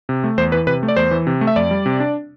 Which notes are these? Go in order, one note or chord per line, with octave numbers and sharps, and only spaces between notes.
C3
A3
E2 C5
E3 B4
C3 B4
A3
D5
E2 C5
E3
C3
A3
E5
F2 D5
G3
C3
D4